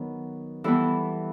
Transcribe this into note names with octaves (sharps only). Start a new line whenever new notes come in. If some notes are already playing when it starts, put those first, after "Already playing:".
Already playing: D#3 F#3 B3
E3 G3 B3 E4 A4